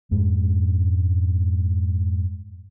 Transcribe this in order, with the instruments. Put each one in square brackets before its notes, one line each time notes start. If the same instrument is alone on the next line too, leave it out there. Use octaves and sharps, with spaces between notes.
[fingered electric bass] F2 G#2 G#3